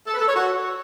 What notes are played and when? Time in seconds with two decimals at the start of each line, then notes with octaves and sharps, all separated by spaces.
0.07 A4
0.14 B4
0.21 A4
0.28 C#5
0.35 F#4